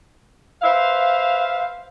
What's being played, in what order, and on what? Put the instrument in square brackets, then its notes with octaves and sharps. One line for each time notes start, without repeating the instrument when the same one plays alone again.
[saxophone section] B4 C5 E5 F5